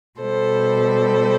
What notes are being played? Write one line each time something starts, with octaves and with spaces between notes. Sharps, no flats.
B2 G3 A4 C5